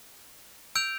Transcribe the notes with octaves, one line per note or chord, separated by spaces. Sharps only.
E6 G6 D7 F7